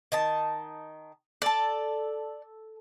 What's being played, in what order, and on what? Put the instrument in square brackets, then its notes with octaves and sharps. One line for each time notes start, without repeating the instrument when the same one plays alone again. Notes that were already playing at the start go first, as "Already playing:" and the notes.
[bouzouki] D#3 D#5 A5
[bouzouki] A4 [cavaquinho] D5 A5